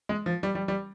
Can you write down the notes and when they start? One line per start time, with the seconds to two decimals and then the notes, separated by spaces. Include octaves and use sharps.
0.09 G#3
0.26 F3
0.43 G3
0.55 G3
0.68 G3